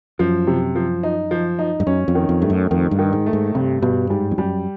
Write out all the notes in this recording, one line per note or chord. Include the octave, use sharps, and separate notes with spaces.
F#2 F3
C3
F3
D#4
F3
D#4
G2
F#2 C#4
F2
D#3
F2
G2 A3
F#2
F2 D#3
G2
D#3
G#2
A3
G#2
G2 C3
G2 B2
G#2 G3
F2
F#2 G3